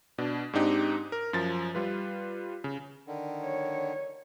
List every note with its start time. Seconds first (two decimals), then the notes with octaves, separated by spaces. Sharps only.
0.18 B2 D4
0.53 G#2 C4 D4 D#4 G4
1.12 A#4
1.33 F#2 F3 A6
1.75 G3 F4 B4
2.64 C#3
3.07 D3 D#3
3.44 C#5